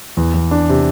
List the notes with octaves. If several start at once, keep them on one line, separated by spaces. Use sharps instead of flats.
E2
E2
D4
C3